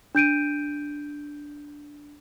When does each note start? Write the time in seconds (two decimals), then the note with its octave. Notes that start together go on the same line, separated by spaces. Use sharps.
0.15 D4 G6 D7 D#7